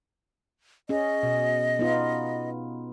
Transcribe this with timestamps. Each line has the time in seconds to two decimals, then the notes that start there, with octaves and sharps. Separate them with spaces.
0.89 C#4 G#4 D#5
1.23 B2
1.79 B3 D#4 F4